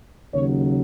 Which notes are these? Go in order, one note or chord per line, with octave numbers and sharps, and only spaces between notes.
D#2 C#3 F#3 C#5